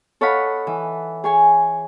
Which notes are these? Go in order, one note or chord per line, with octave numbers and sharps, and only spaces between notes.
A4 C#5 D#5 F5 F#5 B5
E3
G#4 C#5 G#5